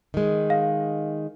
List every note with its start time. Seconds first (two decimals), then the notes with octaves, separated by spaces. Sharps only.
0.14 D#3 G#3
0.50 F5